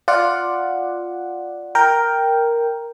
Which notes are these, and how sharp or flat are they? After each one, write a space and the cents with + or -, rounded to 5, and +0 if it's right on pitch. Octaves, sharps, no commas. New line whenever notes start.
F4 +0 D5 +0 F#5 +0
A#4 +0 G5 +0